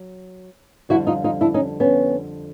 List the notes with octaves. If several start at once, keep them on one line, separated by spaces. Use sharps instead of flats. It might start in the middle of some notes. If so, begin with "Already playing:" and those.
Already playing: F#3
F2 D3 G3 E4 F#4
D#4 F4
D#4 F4
D4 E4
C#4 D#4
B3 C#4